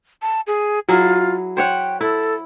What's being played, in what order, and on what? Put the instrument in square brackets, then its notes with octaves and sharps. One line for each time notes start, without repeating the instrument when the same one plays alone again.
[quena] A5
G#4
[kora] F#3 E4 G#4 [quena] F4
[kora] C5 C#5 F#5 [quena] G5
[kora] E4 [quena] A4